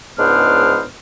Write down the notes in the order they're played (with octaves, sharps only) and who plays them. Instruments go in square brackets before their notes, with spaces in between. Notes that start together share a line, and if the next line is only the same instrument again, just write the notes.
[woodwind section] C#2 G#2 B3 D4 C5 F6